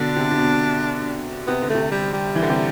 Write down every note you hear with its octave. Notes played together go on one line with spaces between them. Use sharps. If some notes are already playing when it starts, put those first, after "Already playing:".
Already playing: B2 D3 D4
C3
C3
B2
C3 B3
D3
C3 A3
G3
G3
E3
D3
C3